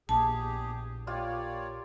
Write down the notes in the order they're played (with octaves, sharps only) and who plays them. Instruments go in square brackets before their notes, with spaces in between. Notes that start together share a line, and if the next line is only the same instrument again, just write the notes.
[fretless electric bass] A#1 [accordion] E2 G4 G#4 [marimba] A5
[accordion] A#3 C#5 D5 [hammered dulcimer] F4 G4